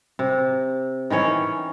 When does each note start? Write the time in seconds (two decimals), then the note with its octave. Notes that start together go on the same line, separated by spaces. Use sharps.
0.19 C3
1.10 D#3 E3 C#4 C#5